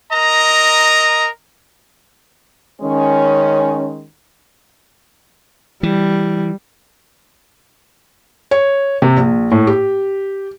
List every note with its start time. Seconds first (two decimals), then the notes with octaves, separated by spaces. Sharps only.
0.12 A#4 D#5 A#5
2.82 D#3 G#3 C#4
5.83 E3 G3
8.51 C#5
9.02 C3
9.17 A#1
9.52 A2
9.67 G4